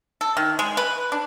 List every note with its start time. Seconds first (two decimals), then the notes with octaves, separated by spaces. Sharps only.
0.21 A4
0.37 D#3
0.59 G#3
0.77 B4
1.12 D4